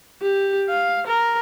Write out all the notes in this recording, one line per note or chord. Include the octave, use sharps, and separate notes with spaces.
G4
F5
A#4